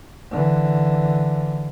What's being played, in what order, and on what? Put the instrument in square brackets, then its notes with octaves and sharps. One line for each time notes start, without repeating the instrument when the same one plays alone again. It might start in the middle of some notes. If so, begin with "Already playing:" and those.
[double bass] D3 E3